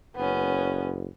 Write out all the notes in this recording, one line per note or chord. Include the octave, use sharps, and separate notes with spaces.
F#1 B3 C#4